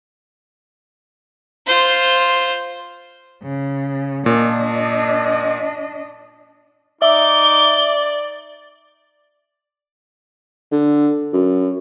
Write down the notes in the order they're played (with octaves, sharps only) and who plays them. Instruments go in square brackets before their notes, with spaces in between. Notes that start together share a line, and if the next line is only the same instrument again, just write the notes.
[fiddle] F4 C5
[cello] C#3
[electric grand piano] A#2 [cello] D4 D#5
[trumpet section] D#4 D6 [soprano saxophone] D5 [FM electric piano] E5 [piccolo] G7
[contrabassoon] D3
F#2